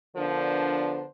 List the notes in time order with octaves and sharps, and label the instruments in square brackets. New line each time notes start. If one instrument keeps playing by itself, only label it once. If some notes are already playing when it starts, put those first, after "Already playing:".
[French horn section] D3 F3 B3 D4 A#4 C5